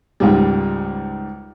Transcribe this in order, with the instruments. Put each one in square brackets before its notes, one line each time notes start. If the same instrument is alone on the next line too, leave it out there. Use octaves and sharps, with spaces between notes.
[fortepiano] C#2 G#2 G3